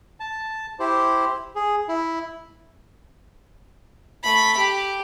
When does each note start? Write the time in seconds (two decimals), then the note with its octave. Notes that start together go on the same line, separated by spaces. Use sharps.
0.20 A5
0.79 E4 G4 C5
1.55 G#4
1.88 E4
4.23 A3 B5
4.58 G4